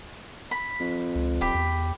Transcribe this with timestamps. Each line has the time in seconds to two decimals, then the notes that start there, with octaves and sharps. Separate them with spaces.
0.51 B5
0.80 F2
1.15 C#2
1.41 D1 G4 B5
1.55 E2